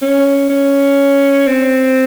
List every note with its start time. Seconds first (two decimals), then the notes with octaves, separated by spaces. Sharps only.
0.02 C#4
0.49 C#4
1.47 C4